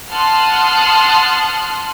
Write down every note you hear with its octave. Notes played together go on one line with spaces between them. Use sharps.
F#5 A5 C6 D#6 F6 F#6